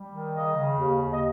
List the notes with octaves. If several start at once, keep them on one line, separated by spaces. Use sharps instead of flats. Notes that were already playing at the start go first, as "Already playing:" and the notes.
Already playing: G3
D#3
C#3 D#5
C#3
D#2
D#2
D#5